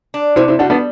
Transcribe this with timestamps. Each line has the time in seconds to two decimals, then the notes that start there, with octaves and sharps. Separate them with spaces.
0.14 D4
0.36 C3 C4 E4
0.48 C4 E4
0.59 G3 D4 F#4
0.70 B3 D4